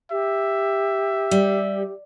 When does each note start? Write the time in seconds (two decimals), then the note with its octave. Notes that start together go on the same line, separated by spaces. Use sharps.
0.11 G4 E5
1.31 G3